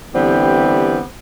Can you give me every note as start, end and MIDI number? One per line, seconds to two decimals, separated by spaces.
0.15 1.00 50
0.15 1.00 52
0.15 1.00 55
0.15 1.00 59
0.15 1.00 60
0.15 1.00 67